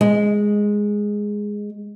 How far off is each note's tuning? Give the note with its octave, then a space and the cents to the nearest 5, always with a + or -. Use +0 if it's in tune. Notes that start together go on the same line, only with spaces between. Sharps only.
G#3 -5